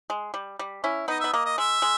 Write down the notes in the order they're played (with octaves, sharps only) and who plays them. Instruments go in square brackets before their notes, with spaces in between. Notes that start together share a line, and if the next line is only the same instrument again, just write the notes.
[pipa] G#3
G3
G3
C#4 E4
[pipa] B3 D#4 [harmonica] D#5
[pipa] B3 [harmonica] E5
[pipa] A#3 [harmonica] D#5
[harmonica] D#5
[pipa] G#3 [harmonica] E5
[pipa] G#3